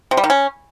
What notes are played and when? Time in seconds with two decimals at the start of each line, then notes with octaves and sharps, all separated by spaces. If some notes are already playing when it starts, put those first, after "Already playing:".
0.11 C3
0.17 G3
0.24 D#3
0.30 C#4